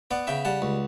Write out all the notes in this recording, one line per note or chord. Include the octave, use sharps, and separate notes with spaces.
B3 D5 F#5
C#3 E5 G5
G3 F#5 A5
C#2